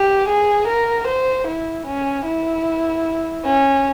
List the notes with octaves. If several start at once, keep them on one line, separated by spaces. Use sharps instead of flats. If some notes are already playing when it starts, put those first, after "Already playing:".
Already playing: G4
G#4
A#4
C5
E4
C#4
E4
C#4